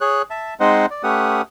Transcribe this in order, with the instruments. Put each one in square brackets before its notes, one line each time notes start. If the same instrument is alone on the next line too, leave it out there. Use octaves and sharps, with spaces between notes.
[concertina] G#4 C#5 F#6
E5 A5
G#3 C4 D#4 C5 D#5 F#5
D5
A3 C#4 G4 B4 F#5 D#6